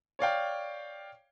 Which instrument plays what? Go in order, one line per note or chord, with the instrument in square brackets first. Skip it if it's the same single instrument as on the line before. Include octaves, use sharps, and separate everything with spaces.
[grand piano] C#5 D5 F5 G5